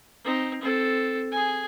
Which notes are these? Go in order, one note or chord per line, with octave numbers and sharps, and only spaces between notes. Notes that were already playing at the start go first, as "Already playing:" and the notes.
C4 D#4
C4 A4
G#4 G#5